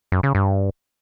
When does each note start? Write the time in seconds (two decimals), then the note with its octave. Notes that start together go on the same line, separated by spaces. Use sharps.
0.12 F#2
0.23 C#3
0.35 G2